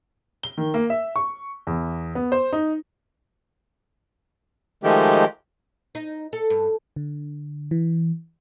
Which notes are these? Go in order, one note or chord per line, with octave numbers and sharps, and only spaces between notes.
G7
D#3
A#3
E5
C#6
E2
B3
C5
D#4
D#3 F3 G#3 A3 G4
D#4
A4
G2
D3
E3